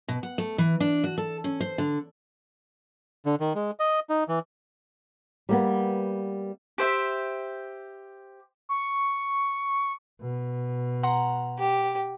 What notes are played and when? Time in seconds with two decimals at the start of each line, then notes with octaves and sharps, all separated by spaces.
0.09 B2
0.23 F#5
0.38 A3
0.58 E3
0.80 D4
1.04 F#4
1.18 A4
1.44 C#4
1.60 C5
1.78 D3
3.26 D3
3.40 D#3
3.55 G#3
3.80 D#5
4.10 D#4
4.29 E3
5.49 G3 A#3 B3
6.78 G4 C5 E5
8.69 C#6
10.21 B2
11.03 F#5 A#5 C6
11.59 G4